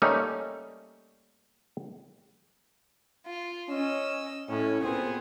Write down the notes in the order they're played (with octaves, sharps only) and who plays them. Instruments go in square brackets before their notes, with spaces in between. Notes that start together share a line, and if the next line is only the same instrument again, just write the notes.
[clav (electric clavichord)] G3 A3 A#3 C#4 D#4
[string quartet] F4
[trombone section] C#4 [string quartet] D#5 E6
[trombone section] A2 [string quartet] C#4
[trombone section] C2 A#2 C4 [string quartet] B3 G#4